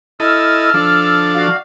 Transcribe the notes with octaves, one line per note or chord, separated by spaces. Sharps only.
E4 A4 D#5 E6 F6
F3 D4 A4
F#4 D5 F5